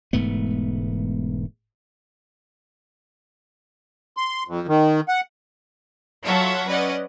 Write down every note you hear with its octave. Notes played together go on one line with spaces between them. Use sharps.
E1 G#2 A3 B3
C6
F2
D#3
F#5
F#3 F4 A4 C#5 E5 F#5
C#4 B4 D5 D#5 F#5